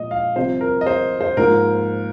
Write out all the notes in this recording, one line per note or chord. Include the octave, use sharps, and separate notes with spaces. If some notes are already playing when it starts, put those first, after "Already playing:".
Already playing: A#2 F3 G#3 D#5
F5
C2 C3 F3 C5
A#4
D#5
C5
C5
G#2 F3 A#3 A#4